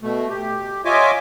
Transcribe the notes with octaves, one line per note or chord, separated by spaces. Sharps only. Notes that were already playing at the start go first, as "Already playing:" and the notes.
B2 A3
G4
F4 C#5 D#5 E5 G#5 D6